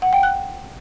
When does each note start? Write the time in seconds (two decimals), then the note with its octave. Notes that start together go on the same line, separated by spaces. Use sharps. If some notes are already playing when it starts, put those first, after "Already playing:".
0.02 F#5
0.13 G5
0.23 F#6